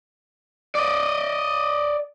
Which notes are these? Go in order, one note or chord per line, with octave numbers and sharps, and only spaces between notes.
D5 D#5